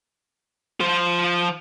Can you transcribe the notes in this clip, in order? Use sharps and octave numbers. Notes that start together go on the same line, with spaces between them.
F3 C5